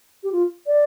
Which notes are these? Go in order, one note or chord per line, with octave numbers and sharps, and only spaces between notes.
G4
F4
D5